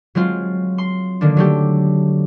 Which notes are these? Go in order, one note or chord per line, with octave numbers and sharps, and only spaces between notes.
F#3 G#3 C4 F4
C6
D3 D#3 A#3 D4
F#3 A3 G4